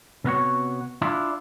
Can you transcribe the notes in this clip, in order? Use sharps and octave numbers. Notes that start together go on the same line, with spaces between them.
C3 B3 F#4 C#5
D4 E4 F4